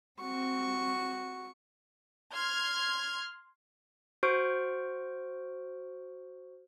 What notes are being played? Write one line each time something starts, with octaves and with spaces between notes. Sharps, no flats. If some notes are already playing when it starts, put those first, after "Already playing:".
C4 F#4 C#6
C6 F6 G#6
F#4 C5 C#6 F6 D7